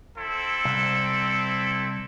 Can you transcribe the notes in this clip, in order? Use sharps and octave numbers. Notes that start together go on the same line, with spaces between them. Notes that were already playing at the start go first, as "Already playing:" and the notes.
C4 E4 A4
C2